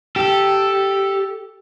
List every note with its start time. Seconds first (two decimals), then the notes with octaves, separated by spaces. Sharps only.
0.16 G4 A4